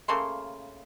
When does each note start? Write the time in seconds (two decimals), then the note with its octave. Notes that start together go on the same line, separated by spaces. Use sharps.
0.08 C#3 A3 A#3 C6